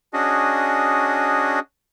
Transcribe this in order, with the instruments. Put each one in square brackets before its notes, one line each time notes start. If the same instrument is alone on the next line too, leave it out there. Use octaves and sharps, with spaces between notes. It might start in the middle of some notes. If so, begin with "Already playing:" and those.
[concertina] C#4 D4 F#4 G#4 D#5